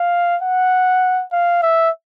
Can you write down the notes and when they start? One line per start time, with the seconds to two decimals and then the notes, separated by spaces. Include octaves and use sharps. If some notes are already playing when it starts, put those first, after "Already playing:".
Already playing: F5
0.43 F#5
1.32 F5
1.63 E5